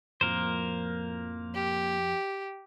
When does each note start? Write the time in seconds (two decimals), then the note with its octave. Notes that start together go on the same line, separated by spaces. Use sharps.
0.21 F2 A2 F3 A#3 A#4 C5
1.55 G4